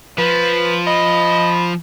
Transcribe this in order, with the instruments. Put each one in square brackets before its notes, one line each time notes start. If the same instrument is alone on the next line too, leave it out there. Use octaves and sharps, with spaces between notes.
[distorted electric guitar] F3 [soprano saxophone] B4
[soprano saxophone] D#5 [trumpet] B5